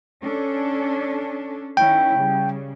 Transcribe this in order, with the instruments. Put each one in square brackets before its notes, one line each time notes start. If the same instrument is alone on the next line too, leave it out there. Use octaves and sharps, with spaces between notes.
[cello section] C#4 D4 A4
[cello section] D#3 C#4 E4 [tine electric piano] G5
[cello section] C#3 G3